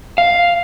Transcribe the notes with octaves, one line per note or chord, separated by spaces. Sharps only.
F5